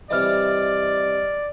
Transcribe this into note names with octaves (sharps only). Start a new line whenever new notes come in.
C3 E3 G3 D5 D#5 F6